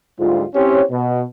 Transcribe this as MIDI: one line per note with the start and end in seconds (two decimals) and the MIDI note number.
0.19 0.44 38
0.19 0.44 44
0.19 0.44 55
0.19 0.44 65
0.54 0.82 60
0.54 0.82 61
0.54 0.82 64
0.54 0.82 67
0.54 0.82 72
0.54 0.82 73
0.91 1.22 47